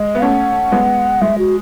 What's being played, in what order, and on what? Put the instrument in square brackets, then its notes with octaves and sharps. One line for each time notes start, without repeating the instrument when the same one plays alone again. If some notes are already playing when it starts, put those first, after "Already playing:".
Already playing: [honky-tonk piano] G#3 [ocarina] D#5
[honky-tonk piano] B3
[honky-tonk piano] A3 C#4 [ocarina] F#5
[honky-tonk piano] G#3 B3
[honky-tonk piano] G#3 [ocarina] E5
[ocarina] F#4